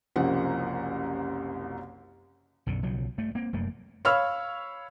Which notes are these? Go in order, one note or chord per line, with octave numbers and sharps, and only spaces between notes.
F#1 C2 F#2 F3 F#5
B1 F#2 D3
B1 C#3 F3 F#3
G2 A3
A#3 C4
F1 F#2 A3 A#3
C#5 F5 B5 C#6 E6 F6